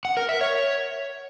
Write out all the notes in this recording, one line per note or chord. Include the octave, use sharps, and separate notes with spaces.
F#5
A#4
E5
C#5